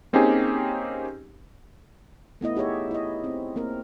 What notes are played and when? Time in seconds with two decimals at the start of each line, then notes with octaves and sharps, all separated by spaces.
0.13 A#3 C4 C#4 D#4 G4 G#4
2.41 A3 B3 E4 D#5
2.56 D#4 G4 G#4 C#5 E5
2.91 E4 D#5
3.24 C4
3.56 A#3 C4 A#4